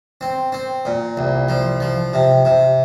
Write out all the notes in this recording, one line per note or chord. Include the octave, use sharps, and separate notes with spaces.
C4
C4
A#2
C2
F3
F3
C3
C3